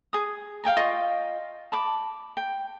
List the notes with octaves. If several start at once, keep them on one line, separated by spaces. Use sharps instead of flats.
G#4 D#6
F5 G5 G#5 A#5
F4 D#5 C#6
A5 B5 D6
G5